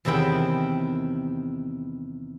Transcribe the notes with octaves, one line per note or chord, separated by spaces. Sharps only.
E2 C3 D#3 E4 G5